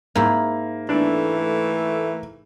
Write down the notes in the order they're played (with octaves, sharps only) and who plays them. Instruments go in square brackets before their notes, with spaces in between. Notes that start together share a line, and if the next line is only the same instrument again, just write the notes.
[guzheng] G#2 E4 [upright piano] A#3
[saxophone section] E3 A3 [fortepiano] D4